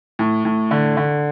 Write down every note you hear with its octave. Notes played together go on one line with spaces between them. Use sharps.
A2
A2
D3
D3